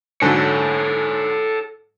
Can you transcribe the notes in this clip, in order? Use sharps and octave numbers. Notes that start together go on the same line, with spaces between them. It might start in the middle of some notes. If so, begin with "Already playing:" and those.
G#2 D3 F#3 A4 C#5